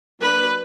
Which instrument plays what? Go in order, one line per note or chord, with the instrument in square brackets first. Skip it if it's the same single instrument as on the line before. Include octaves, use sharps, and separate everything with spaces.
[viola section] F#3 A#3 D4 B4